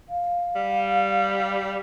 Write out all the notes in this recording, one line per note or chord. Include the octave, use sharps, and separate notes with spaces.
F5
G3